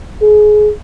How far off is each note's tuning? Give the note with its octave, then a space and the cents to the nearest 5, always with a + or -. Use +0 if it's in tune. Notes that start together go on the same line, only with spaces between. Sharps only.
G#4 +25